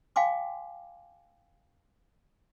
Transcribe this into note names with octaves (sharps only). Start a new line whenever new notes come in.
F5 G5 G#5 C6 D6